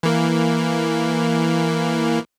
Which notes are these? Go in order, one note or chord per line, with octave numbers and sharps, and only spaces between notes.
E3 A#3